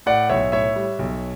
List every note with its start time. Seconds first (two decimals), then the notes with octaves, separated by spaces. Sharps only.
0.06 A2 D5 F#5
0.29 B1 C#5 E5
0.52 A2 C#5 E5
0.76 G3
0.99 B1